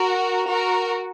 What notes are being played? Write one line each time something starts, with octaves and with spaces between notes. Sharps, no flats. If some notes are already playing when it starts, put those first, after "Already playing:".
Already playing: F#4 A#4
F#4 A#4